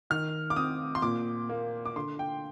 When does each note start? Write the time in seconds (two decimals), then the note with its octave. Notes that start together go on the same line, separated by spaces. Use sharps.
0.10 D#3 F6
0.50 D6
0.56 C4 D#6
0.95 C6
1.02 A#2 D6
1.49 A#3
1.86 D6
1.96 D3 C6
2.19 G5